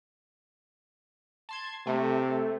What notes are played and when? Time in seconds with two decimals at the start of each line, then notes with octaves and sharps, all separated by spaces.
1.49 A5 C6 G#6
1.87 C3 A3